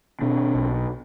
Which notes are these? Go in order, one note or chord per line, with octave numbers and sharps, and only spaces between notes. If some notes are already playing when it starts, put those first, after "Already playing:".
B2 C4 D4
B1